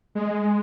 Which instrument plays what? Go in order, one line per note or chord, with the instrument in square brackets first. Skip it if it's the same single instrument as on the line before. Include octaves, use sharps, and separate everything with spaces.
[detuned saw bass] G#3